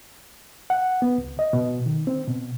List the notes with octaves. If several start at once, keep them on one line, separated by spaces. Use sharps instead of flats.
F#5
B3
C#2
D#5
B2
D#3
C4
B2